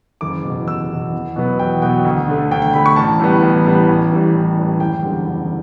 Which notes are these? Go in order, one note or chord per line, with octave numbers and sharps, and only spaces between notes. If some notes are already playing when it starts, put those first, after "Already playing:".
F#1 D6
E2 B2
F#1 E6
E2 B2
E2
B2 F#3 B3
E2 G5
B2 F#3 B3 G5
D2
D3 A3
D2 G5
G5
D3 A3 B5
C#6
A1 A5
A2 G3 B3
A1
A2 G3 B3
A1
A2 E3 G3
A1
A2 E3 G3
F#1 G5
E2 D3 G3
F#1